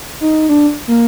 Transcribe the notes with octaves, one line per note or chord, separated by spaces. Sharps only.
D#4
D4
A#3